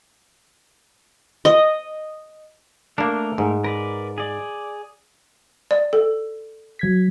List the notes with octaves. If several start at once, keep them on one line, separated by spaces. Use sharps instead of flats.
D#5
A3 A#3 D4 A4 A#4
G#2
A#4 B4 D5
G#4 D5
D5
A4
F#3 G#6 B6